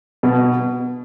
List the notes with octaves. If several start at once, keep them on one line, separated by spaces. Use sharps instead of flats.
B2